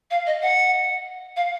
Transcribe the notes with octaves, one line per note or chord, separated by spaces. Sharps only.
F5
D#5
F#5
F5